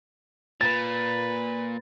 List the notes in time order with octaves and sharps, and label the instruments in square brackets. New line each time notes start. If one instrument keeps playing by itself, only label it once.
[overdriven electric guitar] A#2 [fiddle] B4 [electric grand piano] A6